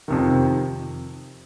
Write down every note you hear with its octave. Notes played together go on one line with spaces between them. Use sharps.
F2 C3 D#3